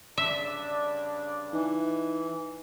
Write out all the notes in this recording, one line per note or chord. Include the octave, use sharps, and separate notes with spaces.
G2 C#3 D4 E5
E3 D#4